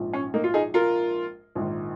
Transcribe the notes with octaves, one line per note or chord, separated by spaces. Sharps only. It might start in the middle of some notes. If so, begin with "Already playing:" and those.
Already playing: A#1 G#2 F3
C#4
A#3 D#4
F4
D#4 G#4
F4 A#4
A#1 G#2 D#3